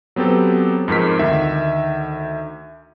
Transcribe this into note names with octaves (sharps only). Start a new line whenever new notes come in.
F#3 B3 C4 G4 A4
F2 G#2 A#4 B6
D2 D#3 E5